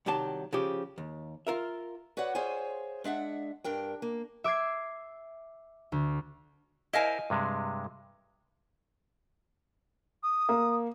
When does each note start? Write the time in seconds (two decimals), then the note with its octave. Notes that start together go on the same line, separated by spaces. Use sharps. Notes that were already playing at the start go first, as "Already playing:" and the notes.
0.06 C2 D#3 F#3 G4 A5
0.53 C#3 F3 G4
0.98 D#2
1.47 F4 A#4 E5
2.17 F#4 B4 C#5 D5 F#5
2.35 F4 G#4 C5 C#5 G#5
3.04 G#3 D4 E5 F#5
3.64 G2 D4 A#4 G5
4.02 A#3
4.44 E5 D6 E6 G#6 C7
5.92 D2
6.93 E4 A#4 C5 D#5 F5 G#5
7.30 G2 C3 G#3
10.23 D#6
10.49 A#3